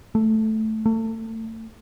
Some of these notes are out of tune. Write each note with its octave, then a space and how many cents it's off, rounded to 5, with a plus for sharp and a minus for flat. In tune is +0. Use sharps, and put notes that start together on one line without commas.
A3 -5
A3 +30